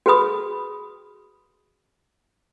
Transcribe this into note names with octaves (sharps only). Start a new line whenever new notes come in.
F#4 G#4 B4 B5 D#6